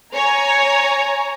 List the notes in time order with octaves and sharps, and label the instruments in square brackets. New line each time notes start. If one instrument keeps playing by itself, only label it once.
[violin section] C#5 G#5 A#5